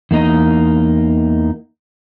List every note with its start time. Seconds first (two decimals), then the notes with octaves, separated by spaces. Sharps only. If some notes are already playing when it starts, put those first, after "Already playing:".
0.11 E2 A#3 D#4 D#5